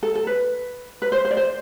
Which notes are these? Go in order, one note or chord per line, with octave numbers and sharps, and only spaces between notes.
A4
A4
B4
B4
C5
C5
D5
C5